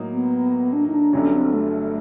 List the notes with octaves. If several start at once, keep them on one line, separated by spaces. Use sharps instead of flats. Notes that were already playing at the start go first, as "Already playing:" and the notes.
Already playing: A2 F#3 A#3 D#4
B3
D4
D#4
D4
G1 G2 D3 F#3 C#4
C4
A3